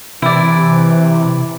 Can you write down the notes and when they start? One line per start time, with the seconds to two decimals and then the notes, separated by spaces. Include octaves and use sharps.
0.22 C3 E3 E4 D5